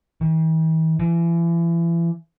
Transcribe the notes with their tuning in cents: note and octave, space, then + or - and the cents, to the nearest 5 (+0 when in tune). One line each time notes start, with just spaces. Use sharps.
E3 -45
E3 +35